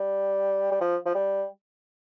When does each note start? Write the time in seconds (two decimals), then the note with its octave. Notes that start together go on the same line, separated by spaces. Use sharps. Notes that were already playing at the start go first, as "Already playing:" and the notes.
Already playing: G3
0.72 G3
0.81 F3
1.06 F3
1.15 G3